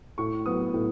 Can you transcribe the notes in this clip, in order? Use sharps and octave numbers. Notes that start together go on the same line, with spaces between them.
A2 C#6
F#3 B3 D#6
A2